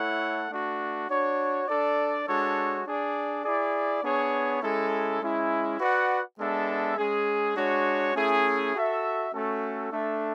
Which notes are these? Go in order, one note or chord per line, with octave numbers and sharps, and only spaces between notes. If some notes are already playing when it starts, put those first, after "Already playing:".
Already playing: A3 E4 A4 C#5 F#5
A3 D4 F#4
D4 F#4 C#5
D4 A4 D5
G#3 D4 F#4 A4 C#5
D4 G#4 D5
E4 G#4 D5
B3 D4 G#4 C#5
G#3 C#4 E4 A4
G#3 C#4 E4
F#4 B4 D5 F#5
G#3 B3 D4 A4 E5
G#3 C#4 G#4
G#3 D4 F#4 C#5
A3 C#4 E4 G#4
F#4 A4 E5
A3 C#4 F#4 A4
A3 D4 A4 E5